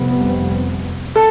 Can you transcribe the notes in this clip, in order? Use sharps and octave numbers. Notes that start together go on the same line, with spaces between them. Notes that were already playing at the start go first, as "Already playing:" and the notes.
Already playing: F1 F2 C3 G3 B3
A4